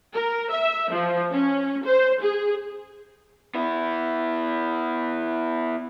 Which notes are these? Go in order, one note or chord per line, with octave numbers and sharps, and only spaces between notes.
A#4
E5
F3
C#4
C5
G#4
B3 E4